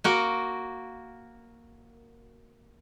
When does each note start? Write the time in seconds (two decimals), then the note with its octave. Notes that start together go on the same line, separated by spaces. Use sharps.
0.04 A#3 F#4 A#4